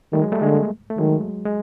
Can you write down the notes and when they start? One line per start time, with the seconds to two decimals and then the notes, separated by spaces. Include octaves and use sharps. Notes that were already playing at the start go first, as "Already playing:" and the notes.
0.13 D#3 G3 A3
0.22 F#3 G#3
0.32 G3 A3
0.41 D3 G#3 A#3
0.90 A3
0.98 D#3 F#3 G#3
1.46 G#3